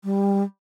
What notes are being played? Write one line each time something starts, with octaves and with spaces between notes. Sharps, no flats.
G3